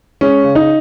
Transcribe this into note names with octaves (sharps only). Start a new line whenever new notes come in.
G#3 C#4
C#3
D#4